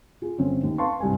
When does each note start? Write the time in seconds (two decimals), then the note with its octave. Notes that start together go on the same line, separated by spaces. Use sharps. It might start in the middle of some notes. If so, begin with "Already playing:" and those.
0.22 F4 G#4
0.38 G1 C4 C#4
0.63 D#2
0.78 B4 F5 A5 C6 C#6
1.00 C2 G2 G#5